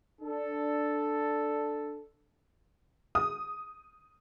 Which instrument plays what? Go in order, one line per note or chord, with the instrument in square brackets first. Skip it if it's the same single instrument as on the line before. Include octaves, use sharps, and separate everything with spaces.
[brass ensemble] D4 A4
[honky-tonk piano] D#6